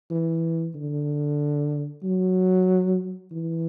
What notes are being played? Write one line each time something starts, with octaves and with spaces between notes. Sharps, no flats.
E3
D3
F#3
E3